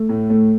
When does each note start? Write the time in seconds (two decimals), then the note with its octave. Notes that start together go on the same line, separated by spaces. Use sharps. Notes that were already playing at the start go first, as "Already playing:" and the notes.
Already playing: A3
0.09 A2
0.30 A3